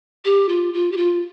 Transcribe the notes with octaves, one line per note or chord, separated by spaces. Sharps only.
G4
F4
F4
G4
F4